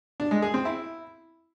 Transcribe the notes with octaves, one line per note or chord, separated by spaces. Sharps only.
D4
G#3
G#4
C4
E4